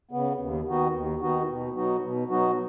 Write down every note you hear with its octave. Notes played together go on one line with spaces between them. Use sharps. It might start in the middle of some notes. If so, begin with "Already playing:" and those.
C#3 B3
D#2
D#3 B3 D#4 F#4
D#2
D#3 B3 D#4 F#4
B2
F#3 B3 D#4 F#4
B2
F#3 B3 D#4 F#4